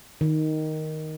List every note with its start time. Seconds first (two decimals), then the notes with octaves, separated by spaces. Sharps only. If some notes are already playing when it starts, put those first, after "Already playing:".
0.21 D#3